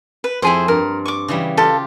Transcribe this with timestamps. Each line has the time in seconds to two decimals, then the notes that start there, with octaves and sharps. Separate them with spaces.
0.24 B4
0.42 F2 C4 E4 G#4 C5
0.68 G2 A#4
1.06 C#6 D6
1.28 C#3 E3 G3
1.57 F4 G4 A4